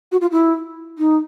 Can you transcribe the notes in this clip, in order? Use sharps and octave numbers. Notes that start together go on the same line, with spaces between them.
F#4
F4
E4
D#4